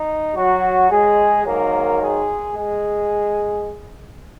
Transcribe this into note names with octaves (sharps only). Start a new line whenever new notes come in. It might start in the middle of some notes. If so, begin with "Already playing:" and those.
Already playing: D#4
F#3 F#4
G#3 G#4
G#2 D#3 F#3 A#3 A#4
G#3 G#4
G#3 G#4